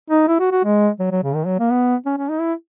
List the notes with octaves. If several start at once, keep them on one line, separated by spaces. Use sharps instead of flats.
D#4
E4
F#4
F#4
G#3
F#3
F#3
C#3
D#3
F#3
A#3
B3
C#4
C#4
D#4
E4